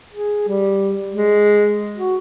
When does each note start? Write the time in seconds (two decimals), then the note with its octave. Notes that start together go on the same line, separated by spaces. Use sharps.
0.13 G#4
0.48 G3
1.12 G#3
1.97 F#4